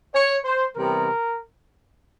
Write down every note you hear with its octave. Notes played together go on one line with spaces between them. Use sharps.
C#5
C5
C3 E3 G3 B3 A#4